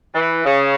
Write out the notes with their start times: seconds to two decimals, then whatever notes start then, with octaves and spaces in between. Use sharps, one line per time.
0.14 E3
0.45 C#3